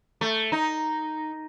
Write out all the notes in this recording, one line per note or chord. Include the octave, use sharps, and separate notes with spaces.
A3
D#4